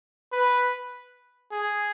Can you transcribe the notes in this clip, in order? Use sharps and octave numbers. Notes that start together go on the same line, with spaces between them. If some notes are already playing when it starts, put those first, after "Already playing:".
B4
G#4